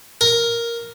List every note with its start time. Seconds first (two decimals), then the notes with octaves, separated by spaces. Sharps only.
0.21 A#4